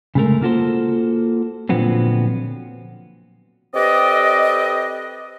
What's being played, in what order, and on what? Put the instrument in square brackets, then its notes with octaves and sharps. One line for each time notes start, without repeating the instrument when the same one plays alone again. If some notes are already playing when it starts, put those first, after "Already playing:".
[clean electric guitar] C#3 G#3 A3 A#4
A#3 F4 F#4 A4 C5
A#2 D3 F3 F#3 B3 C4
[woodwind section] C4 G4 A4 B4 D5 D#5